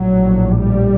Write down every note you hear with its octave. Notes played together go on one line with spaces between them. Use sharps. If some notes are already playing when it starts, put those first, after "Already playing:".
Already playing: A#1 A2 F#3
G3